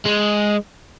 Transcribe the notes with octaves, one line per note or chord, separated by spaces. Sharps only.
G#3